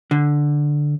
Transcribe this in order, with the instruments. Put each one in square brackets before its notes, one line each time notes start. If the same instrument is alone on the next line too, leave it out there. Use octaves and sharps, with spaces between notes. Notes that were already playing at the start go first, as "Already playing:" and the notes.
[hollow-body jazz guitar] D3